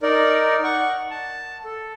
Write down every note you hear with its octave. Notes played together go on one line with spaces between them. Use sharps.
D#4 A#4 D5
F#5 C#6
A5
A4